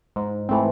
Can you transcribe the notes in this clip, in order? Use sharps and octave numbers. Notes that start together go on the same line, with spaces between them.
G#2
E3 A3 C4